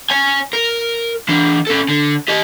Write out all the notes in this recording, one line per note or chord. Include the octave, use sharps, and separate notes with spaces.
C#5 G#5
A#4
E3 D4
C#4 A4
D3
G4 D#5